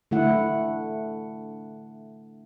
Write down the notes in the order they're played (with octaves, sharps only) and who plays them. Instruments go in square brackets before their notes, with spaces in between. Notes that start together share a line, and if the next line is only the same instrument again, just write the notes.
[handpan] D3 A3 E4 F#5